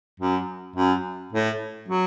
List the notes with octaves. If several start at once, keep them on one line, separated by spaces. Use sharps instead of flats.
F#2
F#2
A2
F#3